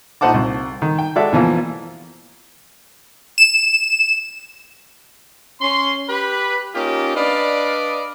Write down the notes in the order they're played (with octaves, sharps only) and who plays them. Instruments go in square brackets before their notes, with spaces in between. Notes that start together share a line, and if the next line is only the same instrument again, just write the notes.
[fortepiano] A#1 D#4 C5 F#5 A5 D6
C2
D#3
G5
G#3 F#4 A4 D5 E5
B2 E3 F3 A#3
[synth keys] E7
[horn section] C#4 C6
G4 B4 B5
A#3 C#4 D#4 F4 G4 A#4
D4 B4 D5 D#5 F5 B5